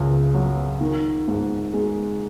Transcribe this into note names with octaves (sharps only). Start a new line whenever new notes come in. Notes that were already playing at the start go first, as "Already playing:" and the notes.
Already playing: C#2 C#3
F#3
D#3
G#2
G#3